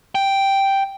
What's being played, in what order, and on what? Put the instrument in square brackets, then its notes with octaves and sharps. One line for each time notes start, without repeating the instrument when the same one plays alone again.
[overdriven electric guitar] G5